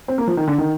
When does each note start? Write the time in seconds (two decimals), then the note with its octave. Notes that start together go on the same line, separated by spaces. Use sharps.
0.08 C4
0.18 A#3
0.27 F3
0.37 D#3
0.48 D3
0.58 D#3